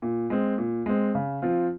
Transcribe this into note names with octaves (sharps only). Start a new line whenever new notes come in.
A#2
G#3 C4
A#2
G#3 C4
C#3
F3 C4 F4